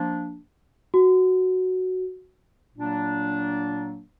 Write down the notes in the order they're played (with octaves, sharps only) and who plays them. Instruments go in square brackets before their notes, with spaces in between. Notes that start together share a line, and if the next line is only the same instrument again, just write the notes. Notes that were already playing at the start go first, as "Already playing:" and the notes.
Already playing: [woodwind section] F3 A#3 D4
[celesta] F#4
[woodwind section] A#2 F#3 A#3 D4